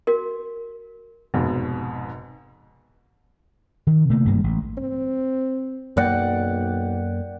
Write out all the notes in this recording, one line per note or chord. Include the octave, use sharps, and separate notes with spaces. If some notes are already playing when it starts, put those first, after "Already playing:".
F#4 A#4
F1 G#2 B2
D#3
C3 A3 A#3
G#1 G2 G#3 A#3
A1
C4
B1 F#2 A#3 D5 F#5 G5